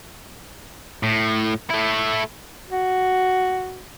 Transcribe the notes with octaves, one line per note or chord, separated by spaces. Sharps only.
A2
A3 E4
F#4